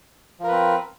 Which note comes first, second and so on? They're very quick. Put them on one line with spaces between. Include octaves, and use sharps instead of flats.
F3 A#4 B4 C4